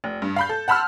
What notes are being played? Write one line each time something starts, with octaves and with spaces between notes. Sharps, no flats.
F1
G2
F5 B5 G6
A4
F#5 A5 B5 C6 E6 F6